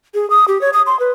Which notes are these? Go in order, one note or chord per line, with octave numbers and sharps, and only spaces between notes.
G#4
D#6
G4
C#5
D#6
C6
B4